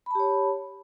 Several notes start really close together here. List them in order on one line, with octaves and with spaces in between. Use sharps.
B5 A5 G4 C#5